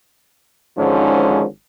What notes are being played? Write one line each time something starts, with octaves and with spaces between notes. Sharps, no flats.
G#1 G#2 D3 F3 C#4